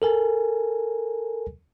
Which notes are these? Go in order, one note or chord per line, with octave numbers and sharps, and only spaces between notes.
A4 A#4 G#5